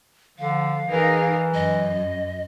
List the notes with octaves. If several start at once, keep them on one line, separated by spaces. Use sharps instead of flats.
D3 F3 F5
E3 D#4 G#4 A#4
F#2 D#5